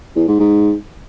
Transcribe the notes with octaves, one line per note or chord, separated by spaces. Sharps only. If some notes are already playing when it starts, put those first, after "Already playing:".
E2
G#2
G#2